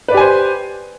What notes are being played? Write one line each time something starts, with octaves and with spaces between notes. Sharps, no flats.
G4 B4 C5 D5 G#5